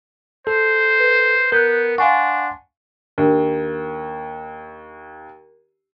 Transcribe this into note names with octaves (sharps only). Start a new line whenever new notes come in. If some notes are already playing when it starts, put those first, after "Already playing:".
A4 C5
B4
B3 A#4 F#6 G6
D4 F5 F#5 G#5 C6 C#6
D#2 D4 A#4